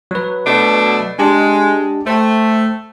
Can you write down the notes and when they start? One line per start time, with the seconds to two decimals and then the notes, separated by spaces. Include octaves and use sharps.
0.11 F#3 B4
0.46 B2 A3 D4
1.19 G#3 D4 G4 A5
2.07 A3 C5 G5